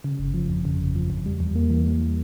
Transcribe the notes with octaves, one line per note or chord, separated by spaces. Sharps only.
C#3
G1
F3
F2
C#3
G1
F3
F2
G3
E2
A#3
E3
G3